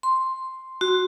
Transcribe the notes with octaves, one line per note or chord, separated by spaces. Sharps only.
C6
F#4